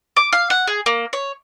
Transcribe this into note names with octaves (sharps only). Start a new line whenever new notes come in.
D6
F5
F#5
G#4
A#3
C#5